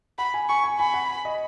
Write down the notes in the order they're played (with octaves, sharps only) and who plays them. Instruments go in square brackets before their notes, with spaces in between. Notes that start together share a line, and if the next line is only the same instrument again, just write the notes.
[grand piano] F#5 [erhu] B5
[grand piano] G#5
[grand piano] G#5 [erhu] C#6
[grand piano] G#5
[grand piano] G#5 [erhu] B5
[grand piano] F#5
D#5